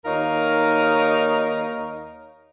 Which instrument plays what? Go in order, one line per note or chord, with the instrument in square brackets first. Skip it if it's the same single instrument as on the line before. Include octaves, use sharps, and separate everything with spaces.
[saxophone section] D#2 D#4 A#4 C#5 F5